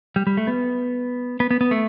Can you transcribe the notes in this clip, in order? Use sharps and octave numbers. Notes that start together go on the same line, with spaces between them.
G3
G3
A3
B3
B3
B3
B3
A3